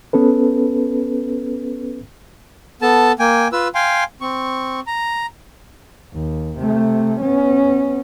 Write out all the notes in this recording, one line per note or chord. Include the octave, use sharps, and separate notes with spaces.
B3 C#4 A4 B4
B3 A4 A5
A#3 G5 G#5
F4 B4 E6
F5 G5 G#5 C6
C4 C#6
A#5
D#2
C3 A3
B3 C#4